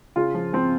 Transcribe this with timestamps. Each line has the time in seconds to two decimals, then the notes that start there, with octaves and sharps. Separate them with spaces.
0.16 C#3 F4
0.34 F3
0.53 F3 C4